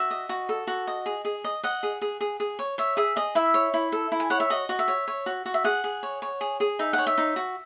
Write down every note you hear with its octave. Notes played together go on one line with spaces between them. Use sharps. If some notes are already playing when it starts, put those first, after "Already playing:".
Already playing: F#4 E5
D#5
F#4
A4
F#4
D#5
G#4
G#4
D#5
D#5 F#5
G#4
G#4
G#4
G#4
C#5
C#5 E5
G#4 E5
G#4 D#5
E4 E5
C#5
E4
A4
E4
G#5
C#5 F#5
E5
F#4 D#5
F#4
E5
C#5
C#5
F#4
F#4
E5
G#4 F#5
G#4
C#5
C#5
G#4
G#4
D#4 E5
F#5
C#5
E5
D#4
F#4